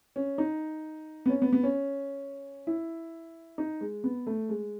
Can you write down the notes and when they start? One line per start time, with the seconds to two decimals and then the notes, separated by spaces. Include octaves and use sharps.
0.16 C#4
0.38 D#4
1.26 B3
1.29 C#4
1.42 B3
1.53 B3
1.63 C#4
2.67 E4
3.58 D#4
3.81 G#3
4.04 B3
4.27 A3
4.49 G#3